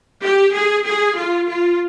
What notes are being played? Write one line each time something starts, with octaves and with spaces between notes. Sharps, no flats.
G4
G#4
G#4
F4
F4